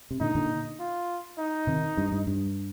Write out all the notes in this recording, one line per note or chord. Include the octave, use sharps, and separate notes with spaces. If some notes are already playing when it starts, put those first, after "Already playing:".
C3
A#2 D3 D#4
A#2 D3
F4
D#4
C3 D#3
G2
G2
G2